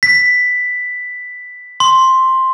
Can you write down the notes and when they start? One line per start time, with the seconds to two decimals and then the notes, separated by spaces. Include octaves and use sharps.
0.03 B6
1.80 C6